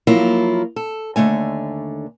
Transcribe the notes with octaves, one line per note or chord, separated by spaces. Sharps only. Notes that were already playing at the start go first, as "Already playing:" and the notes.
F3 F#3 A#3 E4 F4
A4
D#2 D3 A3 G#5